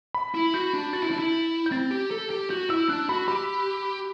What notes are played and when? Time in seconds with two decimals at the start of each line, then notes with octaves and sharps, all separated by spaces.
0.14 B5
0.34 E4
0.54 F#4 G6
0.73 D4
0.93 F#4 A6
1.02 E4
1.11 D4
1.19 E4
1.66 G6
1.71 C4 A6
1.91 G4
2.11 A4
2.30 G4
2.50 F#4 G6
2.69 E4 E6
2.89 D4 F#6
3.09 F#4 B5
3.28 G4 B5